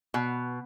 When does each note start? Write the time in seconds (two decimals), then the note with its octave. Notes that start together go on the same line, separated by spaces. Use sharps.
0.14 B2